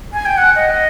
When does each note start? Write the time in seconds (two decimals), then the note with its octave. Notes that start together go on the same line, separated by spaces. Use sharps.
0.13 G#5
0.26 G5
0.37 F#5
0.56 D#5